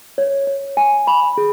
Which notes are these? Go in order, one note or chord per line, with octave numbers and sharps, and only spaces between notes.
C#5
C#5
G#5
B5
G#4